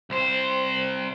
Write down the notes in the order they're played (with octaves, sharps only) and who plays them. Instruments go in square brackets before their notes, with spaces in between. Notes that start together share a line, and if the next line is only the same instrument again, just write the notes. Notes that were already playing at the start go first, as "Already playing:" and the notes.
[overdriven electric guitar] C2 C5